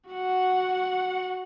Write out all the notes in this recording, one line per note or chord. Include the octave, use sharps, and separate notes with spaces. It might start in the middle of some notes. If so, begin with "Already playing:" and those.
F#4 F#5